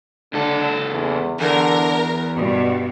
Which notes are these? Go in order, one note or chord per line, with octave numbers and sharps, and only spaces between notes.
C#2 D3 A4
E2
E2 D3 A#4
G2 B2 F#4